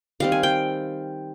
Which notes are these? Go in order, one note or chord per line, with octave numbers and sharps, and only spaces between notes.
D#3 G3 C4 F5
G#5
G5